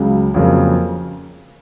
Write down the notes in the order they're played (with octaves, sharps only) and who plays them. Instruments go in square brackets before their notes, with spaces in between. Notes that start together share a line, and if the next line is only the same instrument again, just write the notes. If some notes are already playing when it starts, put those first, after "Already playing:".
Already playing: [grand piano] C#2 C#3 F#3
F2 C#3 F#3 A#3